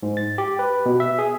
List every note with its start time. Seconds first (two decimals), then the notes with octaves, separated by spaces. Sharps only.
0.03 G#2
0.17 A6
0.38 G4
0.59 B4
0.86 B2
1.00 E5
1.19 G#4